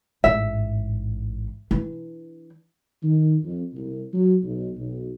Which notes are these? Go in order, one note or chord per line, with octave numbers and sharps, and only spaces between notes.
A1 G#2 E5
E3 D4
D#3
F2
C2
F#3
B1
B1